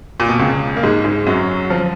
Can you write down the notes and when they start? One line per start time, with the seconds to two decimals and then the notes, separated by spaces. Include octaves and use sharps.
0.20 A#2
0.29 B2
0.39 C#2 C#3
0.76 A#3
0.83 G#2 G#3
1.04 G#2 G#3
1.27 F#2 F#3
1.70 F3